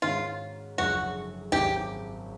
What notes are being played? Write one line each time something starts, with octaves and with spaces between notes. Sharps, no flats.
G#2 D#3 G#3 C#4 F4 F#4
F#1 F#2 D3 F3 G#3 F#4
G#1 F#2 D#3 G#3 G4